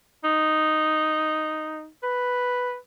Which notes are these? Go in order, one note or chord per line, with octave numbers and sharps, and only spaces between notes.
D#4
B4